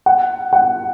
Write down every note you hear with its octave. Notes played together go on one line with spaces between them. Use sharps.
F#5
F#5